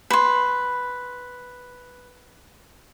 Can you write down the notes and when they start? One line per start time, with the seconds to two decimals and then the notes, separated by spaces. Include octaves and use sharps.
0.10 B4 C6